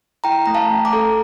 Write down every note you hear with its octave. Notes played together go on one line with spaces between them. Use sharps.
E4 G5 A#5
A3 A#5
F5 A5
A3
A#5 D6
A4